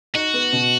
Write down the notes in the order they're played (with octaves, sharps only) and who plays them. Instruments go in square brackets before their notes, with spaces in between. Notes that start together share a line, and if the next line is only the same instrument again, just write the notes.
[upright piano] D#4 [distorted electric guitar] F#4
[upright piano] B3
B2